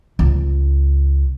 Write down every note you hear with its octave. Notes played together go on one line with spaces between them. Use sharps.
C#2